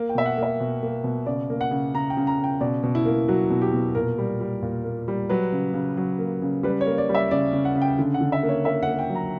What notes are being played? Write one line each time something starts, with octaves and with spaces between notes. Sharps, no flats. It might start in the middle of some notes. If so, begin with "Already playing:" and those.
Already playing: A#3
G5
B2 E5
F#5
A#3 E5
B2
A#3
B2
C#3 D5
A#3
F#5
C#3
C#3 A#5
G5
C#3
A#5
C#3 G5
B2 D5
B2
E4
A#3
F#3 F#4
B2
G4
B2
A#2 A#4
G3
G3
A#2
A#3
G3
F#3 B4
C#3
C#3
F#3
A#3
C#3
G3 B4
C#5
A#3
D5
G3
E5
C#3 D5
C#3
F#5
C#3
G5
D3
F#5
D3
E5
A#3
C#5
A#3 E5
F#5
A#3
G5
F#3
A#5